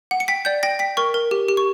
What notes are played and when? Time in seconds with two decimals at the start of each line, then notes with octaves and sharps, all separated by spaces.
0.11 F#5
0.20 C#7
0.28 G5 B6
0.45 D5 G6
0.63 G5 A#6
0.79 G5 B6
0.97 A#4 C#6
1.14 A#4
1.31 G4
1.49 G4
1.57 C#6